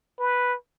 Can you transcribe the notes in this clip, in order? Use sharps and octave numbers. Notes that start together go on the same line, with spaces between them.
B4